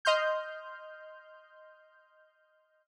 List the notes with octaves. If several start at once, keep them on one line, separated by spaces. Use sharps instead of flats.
D#5 C6 F6 G6